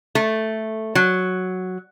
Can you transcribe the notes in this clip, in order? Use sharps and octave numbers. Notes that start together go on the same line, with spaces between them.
A3
F#3